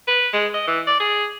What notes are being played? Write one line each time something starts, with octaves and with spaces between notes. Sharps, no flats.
B4
G#3
D#5
E3
D5
G#4